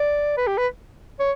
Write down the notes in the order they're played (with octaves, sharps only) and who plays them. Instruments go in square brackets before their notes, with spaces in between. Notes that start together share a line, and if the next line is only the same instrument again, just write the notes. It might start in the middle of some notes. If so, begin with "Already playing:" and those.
Already playing: [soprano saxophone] D5
B4
G4
B4
C#5